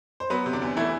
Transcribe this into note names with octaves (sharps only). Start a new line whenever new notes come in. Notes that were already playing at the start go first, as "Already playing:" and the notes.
C5
F#3 B3 B4
C3
D3 D4
E2
E3 A3 E4